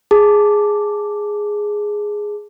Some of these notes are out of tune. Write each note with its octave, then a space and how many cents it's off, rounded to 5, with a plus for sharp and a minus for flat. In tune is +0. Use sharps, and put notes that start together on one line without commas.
G#4 +0 A5 +0 D6 +0